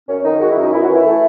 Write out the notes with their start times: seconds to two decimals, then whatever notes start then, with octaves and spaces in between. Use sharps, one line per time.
0.09 F#2 C#4
0.25 D#3 D#4
0.41 G#3 F#4
0.51 E4
0.57 F#2
0.63 D#4
0.72 F#2 E4
0.84 F#4
0.89 E3
0.94 E4
1.05 A3